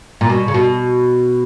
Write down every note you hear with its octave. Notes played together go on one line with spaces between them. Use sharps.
A#2
B2
C#3
B2